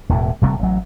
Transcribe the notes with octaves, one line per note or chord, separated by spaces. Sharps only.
E1 E2 A2
E1 C3 G3 A3
A1 F#3